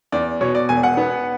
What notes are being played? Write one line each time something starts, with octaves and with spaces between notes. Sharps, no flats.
E2 D5
B2 C#5
D5
E1 G#5
F#5
B3